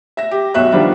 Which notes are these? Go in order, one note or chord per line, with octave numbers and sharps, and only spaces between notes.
E5 A#6
G4
B1 F#4 E5 F#6
D#3 F3 G3 B3 D4